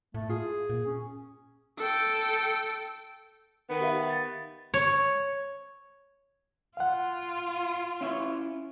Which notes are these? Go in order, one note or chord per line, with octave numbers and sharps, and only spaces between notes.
A2 A3
F4 G#4
A#2
C#4
A4 G5
D#3 B3
G4 E5 F5
A6
C#5
F4 F5 F#5
C#4 E4 C#5